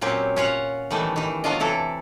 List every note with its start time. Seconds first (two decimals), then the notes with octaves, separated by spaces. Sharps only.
0.01 A#2 F#3 C4 C#4 G4
0.36 C#4 F4 C#5 F#5
0.90 D#3 E3 G3 A3 B3
1.16 D#3 E3
1.44 F#3 B3 D4 F4 D#5
1.60 C3 E3 E4 A4